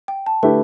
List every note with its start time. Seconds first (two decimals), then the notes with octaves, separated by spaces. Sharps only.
0.08 G5
0.26 A5
0.43 D3 A3 E4 G4 B4